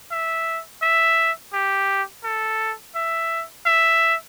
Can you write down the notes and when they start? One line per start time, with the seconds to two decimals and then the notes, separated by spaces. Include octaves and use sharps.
0.11 E5
0.82 E5
1.53 G4
2.24 A4
2.95 E5
3.66 E5